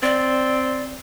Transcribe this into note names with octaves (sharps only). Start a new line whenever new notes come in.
C4 D5